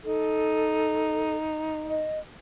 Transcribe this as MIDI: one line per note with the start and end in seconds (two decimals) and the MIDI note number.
0.04 2.05 63
0.04 1.35 69
1.86 2.19 75